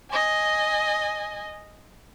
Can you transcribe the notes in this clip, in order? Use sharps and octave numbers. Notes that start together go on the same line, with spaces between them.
D#5 G#5